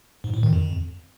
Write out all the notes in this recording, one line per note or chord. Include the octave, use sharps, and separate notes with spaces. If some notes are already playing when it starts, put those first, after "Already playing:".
G#2
A2
D#3
F2